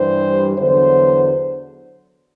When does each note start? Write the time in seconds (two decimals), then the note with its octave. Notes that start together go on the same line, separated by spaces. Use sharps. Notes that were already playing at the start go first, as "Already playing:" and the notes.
Already playing: G2 E3 G3 C5
0.56 E2 D3 F#3 C5